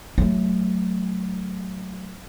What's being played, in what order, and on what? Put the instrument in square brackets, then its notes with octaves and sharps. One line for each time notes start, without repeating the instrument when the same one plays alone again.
[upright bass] F#3 A3